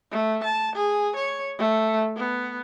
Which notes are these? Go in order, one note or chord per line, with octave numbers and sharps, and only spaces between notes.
A3
A5
G#4
C#5
A3
B3